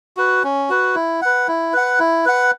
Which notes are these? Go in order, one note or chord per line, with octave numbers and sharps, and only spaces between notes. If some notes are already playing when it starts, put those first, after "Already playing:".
F#4 B4
C#4
F#4 B4
E4
B4 F#5
E4
B4 F#5
E4
B4 F#5